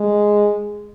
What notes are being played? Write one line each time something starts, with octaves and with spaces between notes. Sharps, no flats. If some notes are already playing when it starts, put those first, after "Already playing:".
Already playing: G#3